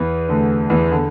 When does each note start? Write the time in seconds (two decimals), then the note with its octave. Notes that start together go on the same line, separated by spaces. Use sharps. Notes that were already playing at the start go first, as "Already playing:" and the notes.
Already playing: E2 E3
0.29 D2 D3
0.70 E2 E3
0.91 D3